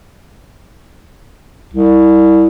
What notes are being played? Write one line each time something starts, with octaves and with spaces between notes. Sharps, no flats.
C2